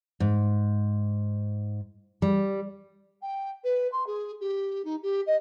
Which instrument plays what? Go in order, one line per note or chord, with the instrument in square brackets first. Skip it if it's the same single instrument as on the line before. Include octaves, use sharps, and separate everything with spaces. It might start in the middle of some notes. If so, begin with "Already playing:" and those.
[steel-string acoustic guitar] G#2
G3
[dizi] G5
B4
C6
G#4
G4
D#4
G4
D#5